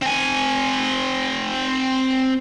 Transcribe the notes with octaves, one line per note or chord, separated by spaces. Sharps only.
C4 G#5